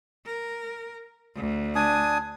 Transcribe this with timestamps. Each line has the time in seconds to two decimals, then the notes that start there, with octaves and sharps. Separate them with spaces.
0.25 A#4
1.36 D2
1.75 D4 G#5 D#6